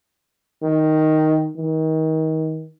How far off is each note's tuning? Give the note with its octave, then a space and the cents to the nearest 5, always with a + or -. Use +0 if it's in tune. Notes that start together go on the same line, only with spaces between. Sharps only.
D#3 +0
D#3 +30